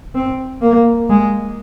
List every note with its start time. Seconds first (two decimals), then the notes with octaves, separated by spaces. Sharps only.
0.15 C4
0.61 A#3
1.10 G#3